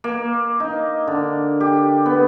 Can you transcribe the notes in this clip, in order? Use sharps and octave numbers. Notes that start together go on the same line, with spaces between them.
A#3
D#4
D3
G4
B3